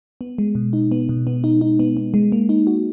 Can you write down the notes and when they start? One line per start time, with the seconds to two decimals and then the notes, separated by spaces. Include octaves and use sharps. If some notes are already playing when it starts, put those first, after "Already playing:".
0.21 B3
0.38 G#3
0.55 B2
0.73 D#4
0.92 B3
1.09 B2
1.27 B3
1.44 D#4
1.61 D#4
1.79 B3
1.97 B3
2.14 G#3
2.32 A#3
2.49 D#4
2.67 F#4